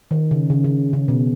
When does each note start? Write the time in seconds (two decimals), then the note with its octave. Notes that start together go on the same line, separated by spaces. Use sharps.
0.11 D#3
0.31 C#3
0.50 C#3
0.64 C#3
0.93 C#3
1.08 B2